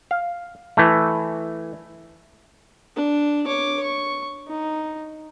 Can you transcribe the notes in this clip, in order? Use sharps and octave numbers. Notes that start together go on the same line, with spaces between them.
F5
E3 A3
D4
C#5 D6
C#6
D#4